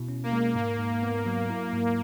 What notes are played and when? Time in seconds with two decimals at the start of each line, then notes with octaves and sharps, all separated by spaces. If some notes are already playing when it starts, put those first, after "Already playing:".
Already playing: B2 E4
0.09 C#4
0.24 A#3
0.32 G#3
0.56 G#2 A#3
0.79 G#2
1.03 B3
1.26 F#3
1.50 E4
1.73 G#2